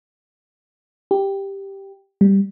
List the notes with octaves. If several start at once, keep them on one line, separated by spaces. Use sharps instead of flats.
G4
G3